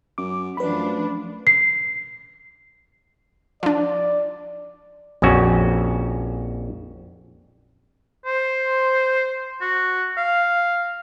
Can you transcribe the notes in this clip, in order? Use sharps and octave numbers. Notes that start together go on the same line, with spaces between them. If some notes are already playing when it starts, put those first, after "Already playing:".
F#2 D6
F#2 F3 A3 D4 B4 B5
C7
F3 D4 D5
A#1 F2 C#4 F#4
C5
F#4
F5